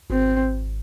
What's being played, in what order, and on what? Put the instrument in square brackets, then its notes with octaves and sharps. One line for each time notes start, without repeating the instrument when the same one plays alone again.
[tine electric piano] G#1 [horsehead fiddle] C4